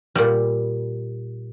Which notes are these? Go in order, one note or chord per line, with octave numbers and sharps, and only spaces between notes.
A#2 G3